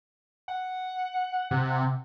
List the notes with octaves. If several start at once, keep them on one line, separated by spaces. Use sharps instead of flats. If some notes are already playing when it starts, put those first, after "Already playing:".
F#5
C3